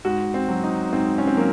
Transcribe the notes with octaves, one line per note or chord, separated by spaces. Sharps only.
G#2 F#4
C4
F#3
D#4
G#2 C4
C#4
C4
F#3 A#3